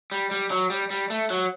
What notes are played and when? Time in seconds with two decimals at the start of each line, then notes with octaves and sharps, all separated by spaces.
0.12 G3
0.31 G3
0.51 F#3
0.70 G3
0.90 G3
1.10 A3
1.30 F#3